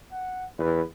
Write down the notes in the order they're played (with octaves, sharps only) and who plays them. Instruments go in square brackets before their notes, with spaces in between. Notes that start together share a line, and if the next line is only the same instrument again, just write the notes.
[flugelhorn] F#5
[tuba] E2 [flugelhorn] B4